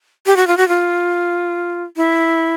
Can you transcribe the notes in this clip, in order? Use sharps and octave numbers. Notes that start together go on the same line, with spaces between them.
G4
F#4
F4
F#4
F4
E4